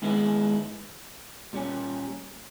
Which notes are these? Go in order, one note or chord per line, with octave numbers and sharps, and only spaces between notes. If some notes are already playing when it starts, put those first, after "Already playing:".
G#2 D#3 G#3 B3 E4
A#2 G3 C#4